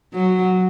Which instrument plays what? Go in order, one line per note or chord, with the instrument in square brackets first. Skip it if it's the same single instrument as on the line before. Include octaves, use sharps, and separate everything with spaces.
[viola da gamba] F#3